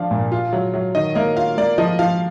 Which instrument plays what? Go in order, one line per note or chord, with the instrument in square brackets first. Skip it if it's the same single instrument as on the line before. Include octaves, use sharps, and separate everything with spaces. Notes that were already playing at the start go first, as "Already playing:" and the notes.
Already playing: [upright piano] F3 D4 [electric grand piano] F5
[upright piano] A#2
F4
F#3
F#3
[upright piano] D#3 [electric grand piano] D#5
[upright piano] A#3 [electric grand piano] D#5
[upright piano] F4 [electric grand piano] F5
[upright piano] A#3 [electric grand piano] D5
[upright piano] F3 [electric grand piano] D#5
[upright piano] F3 [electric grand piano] F5